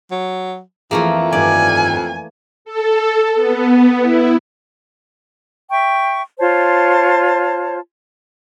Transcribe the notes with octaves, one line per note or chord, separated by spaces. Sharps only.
F#3
F2 E3 F3 A3 A#3 G#4
G2 D#3 G3 D5 G#5
A4
B3
E4
E5 G5 C#6
F4 C5 C#5 A5